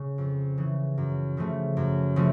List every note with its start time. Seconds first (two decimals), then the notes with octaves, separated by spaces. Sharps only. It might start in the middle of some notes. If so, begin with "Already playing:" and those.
Already playing: C#3
0.18 F2
0.58 C#3 E3
0.98 F#2
1.37 C#3 F3 A3
1.77 F#2
2.16 C#3 F3 A3